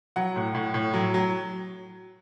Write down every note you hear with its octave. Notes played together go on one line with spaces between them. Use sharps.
F#3 F#5
A2
A2
A2
F#3
F#3